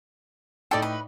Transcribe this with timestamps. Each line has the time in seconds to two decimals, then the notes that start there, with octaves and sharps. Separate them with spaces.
0.71 A2 D#4 A4 D5 G5
0.82 B4